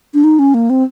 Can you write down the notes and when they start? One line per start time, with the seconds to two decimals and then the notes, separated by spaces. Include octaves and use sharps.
0.14 D4
0.24 D#4
0.39 C#4
0.54 A#3
0.70 C4